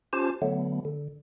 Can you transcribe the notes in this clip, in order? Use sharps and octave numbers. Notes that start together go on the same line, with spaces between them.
C#4 F4 G4 C5 A5
D3 F#3 A3 B3
D3